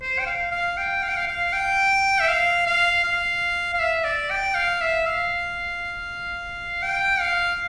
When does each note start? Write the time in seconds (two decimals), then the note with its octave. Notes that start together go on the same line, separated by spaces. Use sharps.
0.02 C5
0.19 G5
0.26 F5
0.51 F5
0.77 G5
1.03 F5
1.09 G5
1.17 F5
1.27 F5
1.53 G5
2.20 E5
2.28 F5
2.67 F5
3.04 F5
3.74 F5
3.79 E5
4.04 D5
4.31 G5
4.55 F5
4.81 E5
5.06 F5
6.82 G5
7.20 F5